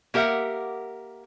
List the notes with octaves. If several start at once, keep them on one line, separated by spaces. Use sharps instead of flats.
A#3 G4 A#4 E5 F#5